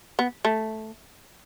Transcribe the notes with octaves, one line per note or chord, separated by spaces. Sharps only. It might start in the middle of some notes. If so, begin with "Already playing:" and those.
B3
A3